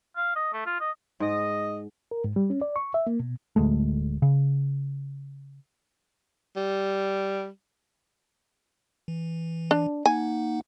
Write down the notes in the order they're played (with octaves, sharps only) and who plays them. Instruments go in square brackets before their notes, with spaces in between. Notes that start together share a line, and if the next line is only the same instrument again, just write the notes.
[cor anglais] F5
D#5
A3
F4
D#5
[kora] G#2 [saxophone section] D#5
[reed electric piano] A#4
G#2
G3
C#4
D5
C#6
E5
A#3
B2
[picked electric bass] D1 D2 G#3 A3
C#3
[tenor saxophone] G3
[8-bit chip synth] E3
[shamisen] D4
[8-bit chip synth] A#3 D#4 F#5 [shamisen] G#5